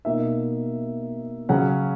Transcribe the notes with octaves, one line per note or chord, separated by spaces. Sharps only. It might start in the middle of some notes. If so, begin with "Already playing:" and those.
B2 A#3 D#4 E5
C#3 F#3 C#4 F#5